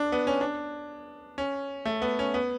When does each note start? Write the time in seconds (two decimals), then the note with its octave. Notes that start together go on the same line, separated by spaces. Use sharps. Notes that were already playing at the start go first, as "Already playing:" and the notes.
Already playing: D4
0.12 B3
0.27 C#4
0.41 D4
1.38 C#4
1.86 A3
2.02 B3
2.19 C#4
2.34 B3